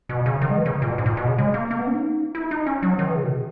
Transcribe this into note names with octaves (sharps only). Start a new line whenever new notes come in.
B2
C#3
D#3
G#3
E3
C#3
A#2
B2
G#2
A#2
B2
C#3
G#3
A#3
A#3
B3
C#4
D#4
E4
D#4
C#4
F#3
D#3
E3
C#3
B2